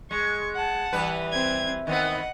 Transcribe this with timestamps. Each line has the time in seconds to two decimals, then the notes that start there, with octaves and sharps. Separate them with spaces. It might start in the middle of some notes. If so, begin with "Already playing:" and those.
0.11 G#3 C#6
0.55 F#5 A5
0.93 E3 G3 B4
1.32 C4 G#6
1.87 D#3 B3 C4 D#5 F#5